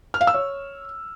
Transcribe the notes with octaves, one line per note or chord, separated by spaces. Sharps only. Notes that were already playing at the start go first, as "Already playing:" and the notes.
F6
F5
E6
C#5